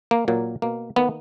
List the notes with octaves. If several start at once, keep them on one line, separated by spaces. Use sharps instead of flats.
A#3
A#2 F#3 A#3
B2 A#3
D#3 A#3 B3